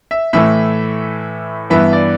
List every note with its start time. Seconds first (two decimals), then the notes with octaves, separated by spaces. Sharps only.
0.11 E5
0.33 A2 E3 A3 E5
1.70 G2 E3 B3 E5
1.93 D5